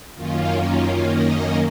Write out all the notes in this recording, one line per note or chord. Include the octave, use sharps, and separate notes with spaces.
F#2 D#3 A#3 C#4 F4
F4
D#5